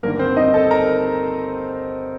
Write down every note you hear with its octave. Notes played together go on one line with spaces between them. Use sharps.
G1 G2 D#3 A#3 A#4
C4 C5
D#4 D#5
A4 A5
A#4 A#5